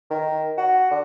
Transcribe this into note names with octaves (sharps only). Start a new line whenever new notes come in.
D#3
F#4
D3